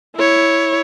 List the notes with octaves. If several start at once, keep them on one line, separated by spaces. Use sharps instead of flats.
E4 C#5